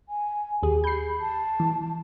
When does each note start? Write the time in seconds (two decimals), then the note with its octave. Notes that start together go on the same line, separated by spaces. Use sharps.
0.09 G#5
0.63 D#2 G4 G#4
0.84 B5 G6 C7
1.20 A5
1.60 E3